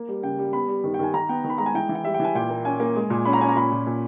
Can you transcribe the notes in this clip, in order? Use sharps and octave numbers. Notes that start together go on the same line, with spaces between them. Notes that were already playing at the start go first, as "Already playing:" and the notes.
Already playing: A#3
G3
C#3 G5
G3
B3 B5
G3
D#3
G5
D#3 G#5
D#3 A#5
B3 G5
D#3
B5
G#3 A#5
G#5
E3 G5
E3
G5
G3 E5
G5
E3 G#5
A#2 G5
A#3
C#4 G#5
A#3
G#3
A#2
C#4 B5
A#5
C#4 G#5
A#5
A#2 B5
A#2
A#2